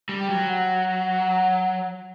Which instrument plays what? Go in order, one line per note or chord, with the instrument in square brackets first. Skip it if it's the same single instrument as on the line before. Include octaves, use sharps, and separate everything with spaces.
[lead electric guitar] G3
[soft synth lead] G5
[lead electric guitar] F#3
[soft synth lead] F#5